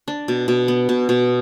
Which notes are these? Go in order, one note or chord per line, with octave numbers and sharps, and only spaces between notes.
D4
B2
B2
B3
B2
B2